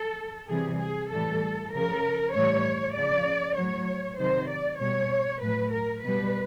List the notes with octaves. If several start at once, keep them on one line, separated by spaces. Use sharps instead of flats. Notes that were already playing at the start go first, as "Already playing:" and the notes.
Already playing: A4
C3 E3 G3 G#4
G#4
A2 E3 G3 A4
C#3 F3 A#4
A2 E3 G3 C#5
C#3 F3 D5
A2 F#3 C#5
C3 D#3 F#3 C5
D5
B2 G3 C#5
A2 F#3 B4
A#4
B2 G3 B4